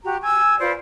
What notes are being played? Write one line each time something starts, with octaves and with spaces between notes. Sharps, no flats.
F#4 G4 A#5
G#5 E6
F4 B4 C5 D5